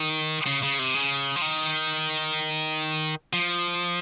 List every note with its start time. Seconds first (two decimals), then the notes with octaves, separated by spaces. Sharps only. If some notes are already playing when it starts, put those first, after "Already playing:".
Already playing: D#3
0.47 C#3
0.63 C#3
0.79 C3
0.94 C#3
1.36 F3
1.42 D#3
3.33 F3